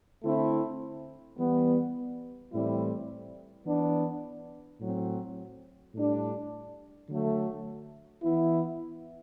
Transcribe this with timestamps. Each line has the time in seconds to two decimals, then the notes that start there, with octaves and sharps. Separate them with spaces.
0.24 D3 A3 C4 E4
1.38 E3 G3 B3
2.52 A2 E3 G3 C4 E4
3.66 E3 B3 D4
4.80 A2 F#3 C4
5.94 A2 G3 D4
7.09 D3 F#3 A3
8.23 E3 B3 E4